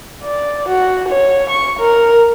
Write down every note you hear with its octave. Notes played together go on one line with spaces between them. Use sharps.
D5
F#4
C#5
C#6
A#4